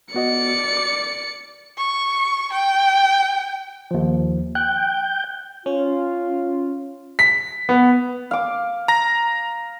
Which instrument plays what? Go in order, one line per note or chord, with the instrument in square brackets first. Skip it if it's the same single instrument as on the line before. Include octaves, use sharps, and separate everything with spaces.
[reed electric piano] B3 F#4 D#5 [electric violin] D5 C#7
[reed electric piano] D6
[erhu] C#6
G5
[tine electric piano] D#2 F3
[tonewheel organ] G5 [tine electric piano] F#6
[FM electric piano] C#4 C#5 [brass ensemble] F4
[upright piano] B6
B3
[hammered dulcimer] F5 D6
[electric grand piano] A#5 A#6